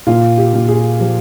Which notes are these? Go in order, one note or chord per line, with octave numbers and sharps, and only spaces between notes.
A#2 F4
G4
A#2
G#4
F3 G4